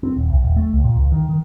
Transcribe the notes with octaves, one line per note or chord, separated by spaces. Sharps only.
C4
D#1
C2
D#1
A3
C#2
A#2
C#2
D#3
D#3